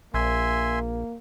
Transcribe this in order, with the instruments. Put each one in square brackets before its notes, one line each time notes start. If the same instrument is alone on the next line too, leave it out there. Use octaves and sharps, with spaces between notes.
[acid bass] A#1 [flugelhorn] A#3 [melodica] E5 G#5 C6